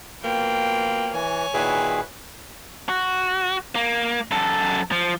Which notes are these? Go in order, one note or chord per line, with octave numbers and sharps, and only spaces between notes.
B2 F3 A#3 G5
E3 C#5 G#5
A#2 D#3 E4 F#4 G#4 B4
F#4
A#3
F#2 A4
F3